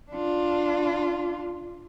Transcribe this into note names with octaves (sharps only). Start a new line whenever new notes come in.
D4 F4